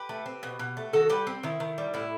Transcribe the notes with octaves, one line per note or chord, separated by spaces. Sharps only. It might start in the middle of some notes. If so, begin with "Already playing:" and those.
Already playing: G4 B4
A3
C4
B2
B2
A3
D#3 F#4 A4
G3 G4 B4
C4
D#3 E4
D#3
G3
A2 E4